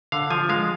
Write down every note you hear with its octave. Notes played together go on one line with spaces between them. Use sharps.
D3 F5
F3 G#5
G#3 F5